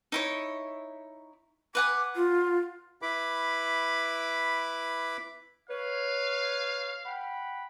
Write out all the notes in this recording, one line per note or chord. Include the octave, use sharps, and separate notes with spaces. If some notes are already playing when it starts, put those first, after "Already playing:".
D#4 E4 C#5
B4 F#5 G#5 D6
F4
E4 B4 B5 D6
B4 C#5 F5
F#5 G5 B5